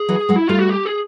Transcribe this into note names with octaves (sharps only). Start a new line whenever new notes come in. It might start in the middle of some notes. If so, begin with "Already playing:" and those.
Already playing: G#4
E3 F#3
F#3 G#3
E4
G3 A3 F4
F#4
G4
G#4